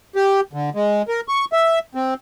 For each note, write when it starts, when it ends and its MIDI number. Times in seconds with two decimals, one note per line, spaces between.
0.16 0.41 67
0.53 0.70 50
0.75 1.02 56
1.08 1.21 70
1.28 1.45 85
1.53 1.79 76
1.95 2.14 60